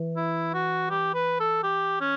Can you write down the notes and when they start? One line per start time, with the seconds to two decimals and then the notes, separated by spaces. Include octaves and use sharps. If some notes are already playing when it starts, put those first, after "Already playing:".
Already playing: E3
0.16 E4
0.54 F#4
0.90 G4
1.14 B4
1.40 A4
1.63 G4
2.01 C#4